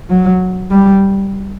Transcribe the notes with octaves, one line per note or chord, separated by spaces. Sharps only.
F#3
G3